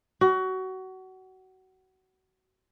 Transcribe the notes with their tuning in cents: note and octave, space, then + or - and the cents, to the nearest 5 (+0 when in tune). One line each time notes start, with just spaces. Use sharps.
F#4 +25